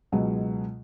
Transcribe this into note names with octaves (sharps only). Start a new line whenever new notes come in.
C#2 B2 F#3 G#3